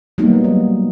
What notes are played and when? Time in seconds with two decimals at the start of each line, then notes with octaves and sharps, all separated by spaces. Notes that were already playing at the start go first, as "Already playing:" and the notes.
0.18 F#3 G3 A#3 B3 D#4
0.44 F#3